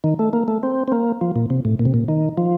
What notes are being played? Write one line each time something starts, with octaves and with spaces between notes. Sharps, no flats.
D#3
A3
A#3
A3
C4
C4
A#3
F3
A#2
C3
A2
A#2
C3
A#2
D#3
F3